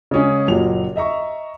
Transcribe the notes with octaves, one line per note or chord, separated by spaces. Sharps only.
C#3 G#3 C#4 G#4
F#1 A#2 F#3 G4 F7
D#5 E5 A#5 C#6